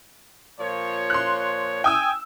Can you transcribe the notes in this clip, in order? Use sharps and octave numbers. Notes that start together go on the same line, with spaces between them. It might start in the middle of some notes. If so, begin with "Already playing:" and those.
A#2 F3 C#5
C6 F#6
G5 G#5 D#6 E6